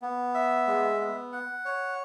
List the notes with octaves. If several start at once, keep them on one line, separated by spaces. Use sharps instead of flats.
B3
E5
G#3
B3
F#5
C#5